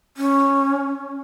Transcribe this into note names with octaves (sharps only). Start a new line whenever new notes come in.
C#4